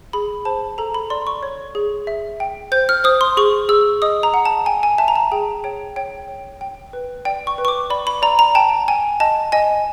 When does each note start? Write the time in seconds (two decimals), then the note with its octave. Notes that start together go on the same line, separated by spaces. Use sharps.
0.13 G#4 B5
0.45 C5 A5
0.78 A4 A#5
0.94 B5
1.10 D5 C6
1.27 C#6
1.43 C#5
1.75 G#4
2.07 E5
2.40 G5
2.72 C5 G6
2.89 F6
3.04 C5 D#6
3.21 C6
3.37 G#4 C#6
3.69 G#4 E6
4.02 D#5 D#6
4.23 A#5
4.34 F#5
4.45 A5
4.66 G5 G#5
4.83 G#5
4.98 E5 A5
5.08 A#5
5.16 A5
5.32 G#4 G5
5.64 C#5 G5
5.96 C#5 G5
6.28 C#5
6.61 G5
6.93 B4
7.25 D5 G5
7.47 C#6
7.58 B4
7.65 C#6
7.68 D6
7.90 D5 B5
8.07 B5
8.22 D5 A#5
8.39 A#5
8.55 G5 A5
8.88 G5 G#5
9.20 D#5 A5
9.52 D#5 G#5